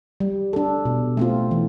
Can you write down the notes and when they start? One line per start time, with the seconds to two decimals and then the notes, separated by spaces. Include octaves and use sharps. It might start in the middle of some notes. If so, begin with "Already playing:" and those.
0.20 G3
0.53 D4 A4
0.85 B2
1.17 A3 C4 F4
1.51 E3